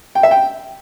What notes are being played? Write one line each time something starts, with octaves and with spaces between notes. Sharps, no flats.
G5
E5
G5